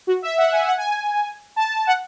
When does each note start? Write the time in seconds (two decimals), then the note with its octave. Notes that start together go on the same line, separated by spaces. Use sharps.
0.07 F#4
0.22 E5
0.38 F#5
0.52 G#5
0.67 F#5
0.78 G#5
1.56 A5
1.87 F#5